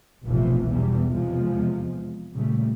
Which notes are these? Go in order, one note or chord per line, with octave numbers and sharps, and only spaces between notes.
F1 B1 A2 C3 E3 F3
B1 E2 B2 E3 G3
E2 C3 F3 G#3
A#2 C#3 G3 A3